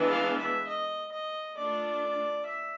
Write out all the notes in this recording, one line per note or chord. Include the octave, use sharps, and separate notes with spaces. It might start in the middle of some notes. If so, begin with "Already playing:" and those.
Already playing: E3 G#3 B3 D4
F5
E5
D#5
D#5
A3 D4 F4 D5
E5